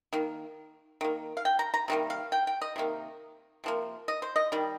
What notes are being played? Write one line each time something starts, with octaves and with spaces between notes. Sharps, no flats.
D#3 A#3
D#3 A#3
F5
G5
A#5
A#5
C3 D#3 G3 A#3
F5
G5
G5
D#5
C3 D#3 A#3
C3 F3 A#3
D#5
C5
D#5
D#3 G3